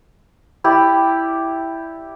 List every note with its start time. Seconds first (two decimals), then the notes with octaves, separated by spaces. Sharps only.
0.64 E4 G4 D5